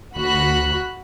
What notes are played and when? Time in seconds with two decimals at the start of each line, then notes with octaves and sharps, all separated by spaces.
0.16 D2 F#4 B5 F#6